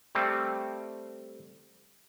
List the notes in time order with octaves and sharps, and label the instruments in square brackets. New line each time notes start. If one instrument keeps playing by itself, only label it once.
[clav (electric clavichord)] G3 A3 C4